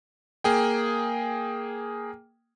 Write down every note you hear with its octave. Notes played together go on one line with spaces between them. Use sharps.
A#3 G#4 G5